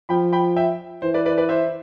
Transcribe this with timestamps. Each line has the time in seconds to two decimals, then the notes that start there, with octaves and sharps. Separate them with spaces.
0.09 F3 G5 B5
0.33 G5 B5
0.56 E5 G5
1.02 E3 C5
1.14 B4 D5
1.26 B4 D5
1.38 B4 D5
1.49 C5 E5